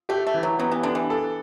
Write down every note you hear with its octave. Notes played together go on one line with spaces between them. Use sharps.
A3 G4
A3
E3
F#3
F#3 B3
E3
D3 D4
E3
A4